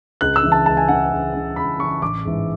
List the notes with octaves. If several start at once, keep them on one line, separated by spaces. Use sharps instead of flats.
C#2 F#6
E6
C#3 E3
A5
C#2 A5
G#5
C#3 E3 F#5
C#2
C#3 E3
C#2 B5
C#3 E3 C#6
A1 D6
G#2 E3